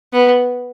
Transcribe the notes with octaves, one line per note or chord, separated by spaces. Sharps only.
B3